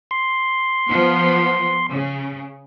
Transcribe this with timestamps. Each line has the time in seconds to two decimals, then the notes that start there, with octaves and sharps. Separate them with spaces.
0.11 C6
0.88 F3 B3
1.89 C#3